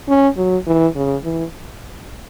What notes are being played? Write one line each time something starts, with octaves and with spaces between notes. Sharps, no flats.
C#4
F#3
E3
C#3
E3